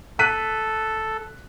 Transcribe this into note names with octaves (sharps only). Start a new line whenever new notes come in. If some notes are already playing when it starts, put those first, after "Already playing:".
A4 F#6 B6 D#7